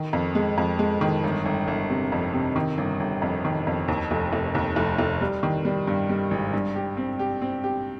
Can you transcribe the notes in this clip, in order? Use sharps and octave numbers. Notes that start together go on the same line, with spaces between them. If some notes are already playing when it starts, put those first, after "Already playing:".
Already playing: D#3
F2
G#3
F2
G#3
D#3
G1
G1
G1
C3
F2
C3
D#3
G1
G1
F2
D#3
F2
D#2
F1
F1
D#2
F1
F1
G3
D#3
G3
G2
G3
G#1
G2
G4
C4
G4
C4
G4